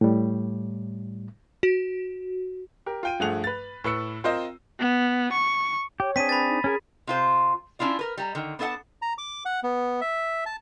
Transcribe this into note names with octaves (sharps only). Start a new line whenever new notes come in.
A2 G3
F#4
G4 A#4
F4 G5 D#7
G2 F3 A3 G#4 F#5 F7
B4 A6
A2 B4 E6 C#7
C4 F4 A#4 C5 D#5
B3
C#6
G4 C#5
C4 D4 G#4 B6 D#7
B4 B5 A6
D#4
C#4 G#4 A#4 G#5
C3 F4 C5
C#4 D4 E4 F4 D5
A#4 B4
G3 A#5
D3 D#3
B3 D4 A4 E5 F#5 A5
A#5
D6
F#5
B3
E5
A5